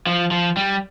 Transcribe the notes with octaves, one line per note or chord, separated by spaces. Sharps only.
F3
F3
G3